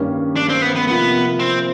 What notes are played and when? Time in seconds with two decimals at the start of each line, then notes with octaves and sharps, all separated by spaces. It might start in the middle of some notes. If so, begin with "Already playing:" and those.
Already playing: G2 D#3 G3 A#3 C#4
0.36 D4
0.49 C4
0.62 B3
0.76 B3
0.88 C3 F3 A#3 B3
1.40 C4